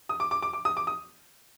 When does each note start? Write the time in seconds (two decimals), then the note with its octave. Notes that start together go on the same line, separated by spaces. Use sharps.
0.09 D#6
0.20 D6
0.31 D6
0.43 D6
0.53 D6
0.65 D#6
0.77 D6
0.87 D#6